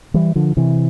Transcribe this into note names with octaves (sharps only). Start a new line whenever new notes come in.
E3 G3
D3 F3
C3 E3